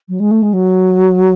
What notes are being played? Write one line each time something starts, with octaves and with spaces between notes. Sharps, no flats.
F#3
G#3
A3
G#3
F#3